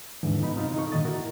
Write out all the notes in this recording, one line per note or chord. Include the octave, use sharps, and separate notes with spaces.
D#2 G#2 D3 E3
F#2 B3 D#4 B5
C3 C4 D#4 F4
D#4 A4 C#6
F#2 A#2 D3 D#3 D#5 A6
E4 F#4 A#4